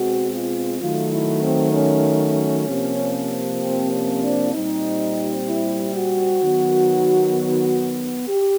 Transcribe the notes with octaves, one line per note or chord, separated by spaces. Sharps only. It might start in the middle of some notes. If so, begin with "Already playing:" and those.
Already playing: B2 G#3 C4 F#4
F4
D#3 F#3 A3 F4
E4
C4
C#4
C3 F3 A#3
C4
C#4
D4
A#2 G3 C4 D#4
E4
F#4
D#3 F#3 B3
G4